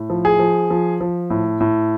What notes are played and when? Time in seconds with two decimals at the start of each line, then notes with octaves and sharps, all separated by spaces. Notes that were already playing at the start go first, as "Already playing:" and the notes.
Already playing: A2
0.10 F3
0.25 G#4
0.39 F3
0.70 F3
1.01 F3
1.30 A2
1.60 A2